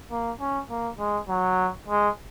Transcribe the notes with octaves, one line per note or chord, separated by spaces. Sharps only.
A#3
C#4
A#3
G#3
F#3
G#3